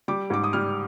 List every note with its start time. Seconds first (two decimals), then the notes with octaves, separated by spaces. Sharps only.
0.08 G3 D6
0.30 G#2 D6
0.44 D#6
0.53 G3 F6